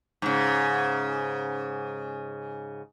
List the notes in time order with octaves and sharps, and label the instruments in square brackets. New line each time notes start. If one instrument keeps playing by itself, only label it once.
[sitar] G#2 C#3